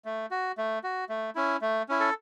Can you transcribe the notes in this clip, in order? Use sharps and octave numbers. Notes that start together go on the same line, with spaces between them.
A3
F#4
A3
F#4
A3
C#4 E4
A3
C#4 E4
A4